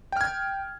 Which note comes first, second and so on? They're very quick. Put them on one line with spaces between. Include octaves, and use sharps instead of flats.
G5 F6 G#6